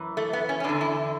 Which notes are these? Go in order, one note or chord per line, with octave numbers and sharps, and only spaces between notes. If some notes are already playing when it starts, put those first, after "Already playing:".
Already playing: F#2 E3
A3
B3
C#4
C#4
E2 D3 D4
E4